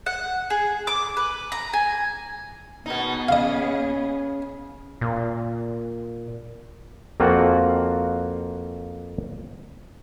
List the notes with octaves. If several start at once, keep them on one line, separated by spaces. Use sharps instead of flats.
F#5
G#4
D6
B4
A#5
G#5
B2 B3 D#4 G#4
C#3 D#5 F5
A#2
F2 A#3 C4 F4 F#4 F#5